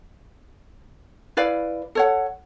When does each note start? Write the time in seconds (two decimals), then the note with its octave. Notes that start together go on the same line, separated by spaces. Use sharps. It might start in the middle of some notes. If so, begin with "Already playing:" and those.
1.37 E4 B4 D5 F5
1.95 A4 C#5 F#5